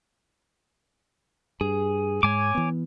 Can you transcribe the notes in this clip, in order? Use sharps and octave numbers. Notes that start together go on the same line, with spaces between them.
G2 G#4
G#2 G#3 C#5 G#5 D6
E3 B3